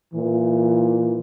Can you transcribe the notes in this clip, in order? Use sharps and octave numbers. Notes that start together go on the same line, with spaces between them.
A#2 E3